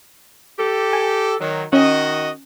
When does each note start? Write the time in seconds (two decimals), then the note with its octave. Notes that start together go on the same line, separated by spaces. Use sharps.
0.59 G4 A4
0.93 G#5
1.40 D#3 F#3
1.73 D#3 C#4 F#4 D#5